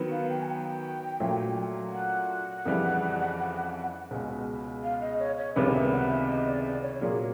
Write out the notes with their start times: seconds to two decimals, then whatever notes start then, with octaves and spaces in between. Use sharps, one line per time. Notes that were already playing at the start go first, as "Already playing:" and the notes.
Already playing: D#3 F#3 B3
0.11 F5
0.29 G5
0.42 G#5
0.48 G5
1.20 A#2 F#3 A3 C#4
1.93 F#5
2.65 F2 C#3 E3 G3
4.11 C#2 B2 G#3
4.83 F5
5.01 D#5
5.19 C#5
5.38 C#5
5.56 C#2 C3 D#3 G3 B3 D5
5.74 E5
5.92 F#5
6.10 E5
6.28 D#5
6.46 D5
6.64 D5
6.82 C#5
7.00 A#2 F#3 A#3 G#4